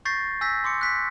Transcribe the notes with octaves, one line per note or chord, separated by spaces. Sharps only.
C#6 G6 A6 A#6 C7
G#5 E6 G6 A#6 B6
C6 D6 C#7
F#6 B6